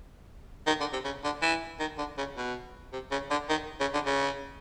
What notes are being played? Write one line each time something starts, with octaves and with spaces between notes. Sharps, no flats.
D#3
D3
C3
C#3
D3
E3
D#3
D3
C#3
B2
C3
C#3
D3
D#3
C#3
D3
C#3